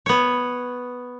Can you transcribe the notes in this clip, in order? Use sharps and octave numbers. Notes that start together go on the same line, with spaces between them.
B3 C#5